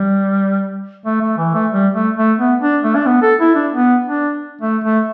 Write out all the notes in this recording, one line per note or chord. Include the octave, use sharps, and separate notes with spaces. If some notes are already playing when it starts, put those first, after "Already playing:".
Already playing: G3
A3
A3
E3
A3
G3
A3
A3
B3
D4
A3
D4
B3
A4
E4
D4
B3
D4
A3
A3